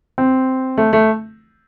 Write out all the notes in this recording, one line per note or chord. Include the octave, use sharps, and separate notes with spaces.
C4
A3
A3